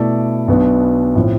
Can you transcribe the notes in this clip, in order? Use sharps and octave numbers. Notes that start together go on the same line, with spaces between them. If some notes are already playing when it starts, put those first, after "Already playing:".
Already playing: B2 A3 E4 A4 D5
B1 B2 B3 D4
A2 F3 C4